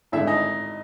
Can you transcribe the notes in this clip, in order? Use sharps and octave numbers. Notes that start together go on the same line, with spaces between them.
G#1 G2 D3 E4 E5
D#4 D#5